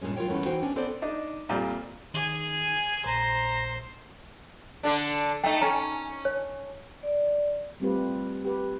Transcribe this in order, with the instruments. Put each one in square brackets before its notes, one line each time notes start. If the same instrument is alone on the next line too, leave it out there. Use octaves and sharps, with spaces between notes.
[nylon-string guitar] G2 A#2 G#3 C#4
F#3 F4 A#4 C#5 G5
E2 G2 A3 B3 C#4 E4
E3 D#4 F#4 C5 G5
B3 C#4 D4
B3 C4 A4 C5 D5
[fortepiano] D4 D#4
F2 A#2 F3 G3
[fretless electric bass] D#3 [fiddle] G#4 G#5
[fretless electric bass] A#1 [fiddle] C5 [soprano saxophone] A#5
[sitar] D3 D4
[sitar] A3 D#4 [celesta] G5
[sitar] C#4 [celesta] A#5
[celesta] C#5
[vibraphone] D5
[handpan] G3 A3 C4 F4 G4 B4
G4 B4